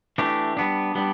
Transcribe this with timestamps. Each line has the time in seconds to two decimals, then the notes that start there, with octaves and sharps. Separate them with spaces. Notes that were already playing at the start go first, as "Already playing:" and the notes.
0.18 E3 A3 D4 G4
0.57 G3 B3 D4
0.95 G3 B3 D4